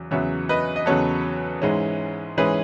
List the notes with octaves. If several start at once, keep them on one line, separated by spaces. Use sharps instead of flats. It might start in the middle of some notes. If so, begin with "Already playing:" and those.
Already playing: E2 C#3 F#3
E2 C#3 F#3 B3 C#5 E5
B4 D#5
D#5
E2 C#3 F#3 B3 A4 C#5
G#2 E3 G#3 C#4
G#2 E3 G#3 C#4 G#4 B4